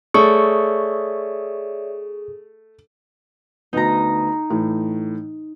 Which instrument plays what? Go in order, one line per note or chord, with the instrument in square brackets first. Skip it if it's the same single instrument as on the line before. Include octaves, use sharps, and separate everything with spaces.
[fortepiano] A3 [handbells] G#4 [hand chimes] C#5 D5 E5 [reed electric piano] C#6
[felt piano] D2 B3 [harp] D#4 A#5
[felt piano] A2 E3